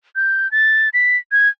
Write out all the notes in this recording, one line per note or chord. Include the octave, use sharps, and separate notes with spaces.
G6
A6
B6
G#6